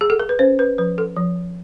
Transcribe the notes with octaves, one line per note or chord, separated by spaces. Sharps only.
G#4
A4
A#4
B4
C#4 C5
B4
F3 B4
A4
F3